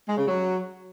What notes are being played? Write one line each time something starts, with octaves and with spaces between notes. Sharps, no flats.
G#3
C#3
F#3